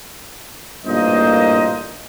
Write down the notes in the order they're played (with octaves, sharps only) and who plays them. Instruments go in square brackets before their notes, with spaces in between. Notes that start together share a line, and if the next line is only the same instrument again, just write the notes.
[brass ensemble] A1 G2 A#2 A#3 C5 D#5